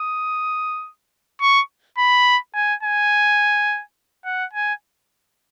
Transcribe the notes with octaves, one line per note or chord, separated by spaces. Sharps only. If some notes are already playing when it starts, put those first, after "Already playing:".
Already playing: D#6
C#6
B5
G#5
G#5
F#5
G#5